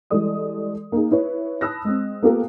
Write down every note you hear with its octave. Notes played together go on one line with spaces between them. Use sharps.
E3 G3 G#3 A4 D5 D#6
A#3 D#4 G#4
E4 B4 C#5
A5 B5 D#6 E6 F#6 A#6
G#3 C4
A#3 B3 F4 G4 A4 A#4